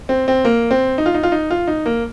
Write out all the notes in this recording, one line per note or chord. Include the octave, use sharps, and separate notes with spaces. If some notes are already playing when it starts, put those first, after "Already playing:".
C4
C4
A#3
C4
D#4
F4
D#4
F4
D#4
F4
D#4
A#3